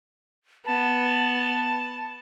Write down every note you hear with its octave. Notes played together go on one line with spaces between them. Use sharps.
B3 A5